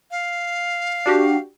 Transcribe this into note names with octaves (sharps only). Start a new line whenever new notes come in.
F5
D4 F#4 G4